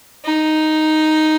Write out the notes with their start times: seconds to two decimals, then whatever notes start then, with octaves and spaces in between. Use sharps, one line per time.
0.25 D#4